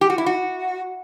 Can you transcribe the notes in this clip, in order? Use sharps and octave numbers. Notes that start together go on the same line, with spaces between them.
G4
F#4
E4
F#4